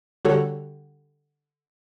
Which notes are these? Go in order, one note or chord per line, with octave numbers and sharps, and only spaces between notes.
D3 G3 F#4 A4 C#5